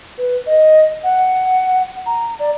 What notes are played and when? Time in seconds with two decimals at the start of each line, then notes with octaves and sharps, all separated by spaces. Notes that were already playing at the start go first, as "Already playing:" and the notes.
0.18 B4
0.47 D#5
1.04 F#5
2.06 A#5
2.39 D5